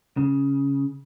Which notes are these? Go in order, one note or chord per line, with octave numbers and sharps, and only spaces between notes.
C#3